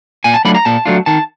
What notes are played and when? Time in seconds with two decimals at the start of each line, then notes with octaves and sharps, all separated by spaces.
0.24 A#2 G#5
0.34 A5
0.45 F#3 A3 D4 F4 B5
0.55 A#5
0.65 A#2 A5
0.86 F#3 A3 D4 F4
1.06 D#3 A5